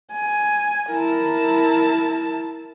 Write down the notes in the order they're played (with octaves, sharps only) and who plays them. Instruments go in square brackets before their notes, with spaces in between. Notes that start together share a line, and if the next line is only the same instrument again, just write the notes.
[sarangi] G#5
[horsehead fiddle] E4 A5 [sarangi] A#4